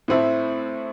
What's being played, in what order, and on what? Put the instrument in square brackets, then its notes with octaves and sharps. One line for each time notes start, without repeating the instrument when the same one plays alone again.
[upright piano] A2 A3 C4 E4